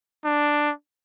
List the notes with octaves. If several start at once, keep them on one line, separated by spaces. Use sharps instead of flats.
D4